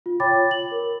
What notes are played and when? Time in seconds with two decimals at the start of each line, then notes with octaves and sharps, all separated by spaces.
0.06 F4
0.20 C#5 G5 B5 D6 A6
0.51 F#7
0.72 A#4